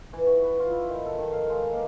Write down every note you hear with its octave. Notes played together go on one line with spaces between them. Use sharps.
E3
F#4
B4
F4
E4
D#3
A4
D#3
F5
G#3
A#3